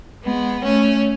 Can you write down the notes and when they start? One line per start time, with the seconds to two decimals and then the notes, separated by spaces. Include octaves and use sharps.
0.23 G#3 B3
0.62 A3 C#4